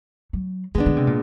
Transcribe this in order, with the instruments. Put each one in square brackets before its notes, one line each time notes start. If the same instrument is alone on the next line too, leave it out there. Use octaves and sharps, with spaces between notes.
[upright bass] F#3
[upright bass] D#3 [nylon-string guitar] G#3
[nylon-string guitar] B3 D4
[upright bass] D3
C3
A#2